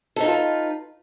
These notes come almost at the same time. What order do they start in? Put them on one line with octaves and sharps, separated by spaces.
A4 D#4 F4 B4